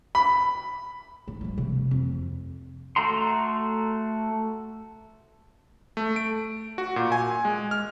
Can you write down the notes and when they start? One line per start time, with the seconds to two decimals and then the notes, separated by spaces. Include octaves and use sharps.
0.15 B5
1.28 G#2
1.41 F3 G3
1.58 C3
1.91 F2
2.96 A3 F#4 A#5 C6
5.97 A3
6.16 D7
6.78 F#4
6.96 A#2
7.12 G#5
7.45 G#3
7.71 F6